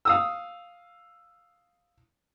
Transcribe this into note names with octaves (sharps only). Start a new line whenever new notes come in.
F5 D#6 E6